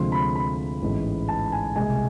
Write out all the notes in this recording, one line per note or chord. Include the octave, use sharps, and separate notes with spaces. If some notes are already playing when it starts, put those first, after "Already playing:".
Already playing: D2 C3 F3 G#3 C6
B5
B5
A1 G#2 G#3
A5
G#5
C2 B2 G#3 G#5